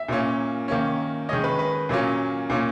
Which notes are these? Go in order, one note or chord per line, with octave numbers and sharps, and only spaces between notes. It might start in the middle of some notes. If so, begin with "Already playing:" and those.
Already playing: E5
A#2 A#3 C#4
D#3 A#3 C#4
D#3 G#3 C#4 D#5
B4
B4
A#2 F#3 A#3 C#4
A#2 A#3 C#4